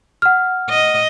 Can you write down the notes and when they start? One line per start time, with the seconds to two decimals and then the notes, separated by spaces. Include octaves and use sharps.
0.22 F#5 F6
0.69 D#5